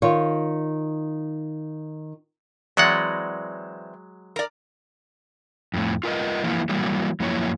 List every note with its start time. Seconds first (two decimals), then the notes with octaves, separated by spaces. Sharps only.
0.02 D#3 F4 C#5
2.77 E3 F#3 G#3 C4 D5 F#5
4.36 A#4 D5
5.74 F2 A2
6.03 F4 A#4 B4 D#5
6.44 E3 F3 A#3 E4 F4
6.69 E3 F#3 G3 A#3
7.20 F#2 F3 F#3 A#3 E4 C#5